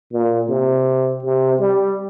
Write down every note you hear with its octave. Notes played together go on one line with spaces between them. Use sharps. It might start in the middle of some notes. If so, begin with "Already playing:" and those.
A#2
C3
C3
G3